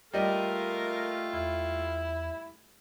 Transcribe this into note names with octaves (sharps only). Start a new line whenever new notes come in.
G3 A3 F4 A#4 D#5
E2 E4